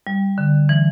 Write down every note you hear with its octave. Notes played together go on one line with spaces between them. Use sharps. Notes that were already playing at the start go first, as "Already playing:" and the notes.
G3
D3
E3